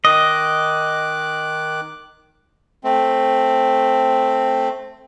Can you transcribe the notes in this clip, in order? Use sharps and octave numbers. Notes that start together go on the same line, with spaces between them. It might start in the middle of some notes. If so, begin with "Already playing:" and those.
D#3 D#5 D6 F#6
A3 C4